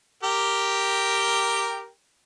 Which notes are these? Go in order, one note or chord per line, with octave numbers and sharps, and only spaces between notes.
G4 A#4 G5